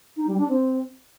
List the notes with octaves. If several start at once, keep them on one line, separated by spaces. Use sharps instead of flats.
D#4
G3
D4
C4